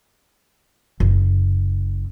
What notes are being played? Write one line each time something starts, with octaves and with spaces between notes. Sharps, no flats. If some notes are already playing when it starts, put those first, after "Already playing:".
F#1